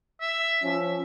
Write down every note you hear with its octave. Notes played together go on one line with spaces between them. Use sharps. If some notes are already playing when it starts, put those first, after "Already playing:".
E5
F3 C#4